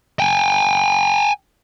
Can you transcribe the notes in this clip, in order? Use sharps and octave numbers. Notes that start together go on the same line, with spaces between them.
G5 G#5